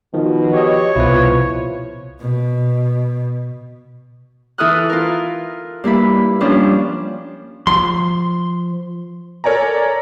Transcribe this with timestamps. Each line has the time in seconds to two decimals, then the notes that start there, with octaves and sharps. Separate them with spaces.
0.14 B2 D#3 F3
0.54 G4 C#5 D#5
0.96 C2 B2 F3 E4 B4
2.20 B2
4.58 E3 E4 A4 D#6 F6 F#6
4.90 F4 A#4
5.84 G2 A#3 E4 B5
6.41 F3 G3 A#3 C#4 D4
7.67 F3 C6
9.44 A4 A#4 C#5 D5 G#5 A#5